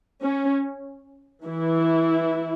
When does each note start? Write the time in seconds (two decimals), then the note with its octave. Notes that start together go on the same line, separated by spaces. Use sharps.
0.22 C#4
1.45 E3 E4